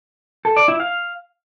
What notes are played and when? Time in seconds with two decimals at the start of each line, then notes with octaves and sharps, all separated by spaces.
0.45 A4
0.57 D5
0.68 E4
0.80 F5